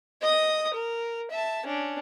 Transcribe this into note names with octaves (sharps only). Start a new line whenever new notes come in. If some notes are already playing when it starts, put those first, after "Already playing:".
D#5 D#6
A#4
E5 A5
C#4 D4